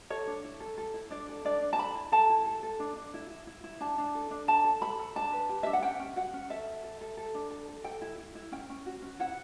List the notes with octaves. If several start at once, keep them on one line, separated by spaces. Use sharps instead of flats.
A4 C#5
D4
E4
A4
A4
E4
D4 D5
A4
D4 D5
D4
A5
A4 B5
E4
A4 A5
E4
A4
A4
D4
D4
E4
E4
E4
E4
D4 A5
D4
A4
D4
A4 A5
A4
A4 B5
A4
D4 A5
B4
G4
D4 E5
F#5
C#4 G5
C#4
F#4 F#5
C#4
A4 E5
A4
A4
A4
A4
D4
A4
A4
A4 G5
E4
E4
E4
C#4 G5
C#4
F#4
C#4
E4 F#5